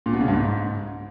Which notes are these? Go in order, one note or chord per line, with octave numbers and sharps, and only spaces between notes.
A#2
B2
C#3
G2
G#2